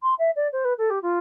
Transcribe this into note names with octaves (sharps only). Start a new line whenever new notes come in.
C6
E5
D5
C5
B4
A4
G4
F4